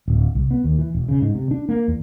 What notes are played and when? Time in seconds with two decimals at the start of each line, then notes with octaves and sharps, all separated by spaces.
0.08 D1
0.35 C2
0.51 B3
0.64 D#2
0.79 E3
0.95 E1
1.09 C#3
1.22 G#2
1.35 C3
1.51 D4
1.69 A#3
1.88 E2